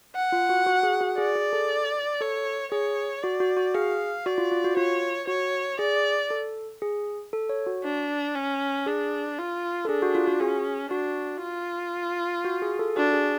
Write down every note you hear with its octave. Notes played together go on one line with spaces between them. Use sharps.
F#5
F4
F#4
F#4
G#4
F#4
G#4 D5
G#4
A4
A4 C#5
G#4 C#5
F#4 D5
F#4
F#4
G#4 F5
F#4 D5
F4
F4
F#4
F4 C#5
F#4 C#5
G#4 D5
A4
G#4
A4
C#5
F#4
D4
C#4
D4 G#4
F4
A4
D4 G#4
F#4
F4
F#4
C#4 G#4
D4 F#4
F4
F#4
G#4
A4
D4 F#4
G#4